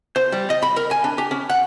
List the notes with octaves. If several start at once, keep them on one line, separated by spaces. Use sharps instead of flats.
C5
G3
D#5
B5
A#4
G#5
D4
G4
C#4
F#5